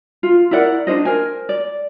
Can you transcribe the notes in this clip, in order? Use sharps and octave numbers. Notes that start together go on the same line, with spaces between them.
F4
E4 A#4 D5 F#5
D4 F4 C5 D#5
A#4 C5 G#5
D5